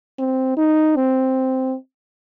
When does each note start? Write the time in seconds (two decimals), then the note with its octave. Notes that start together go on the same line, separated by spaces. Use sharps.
0.19 C4
0.57 D#4
0.96 C4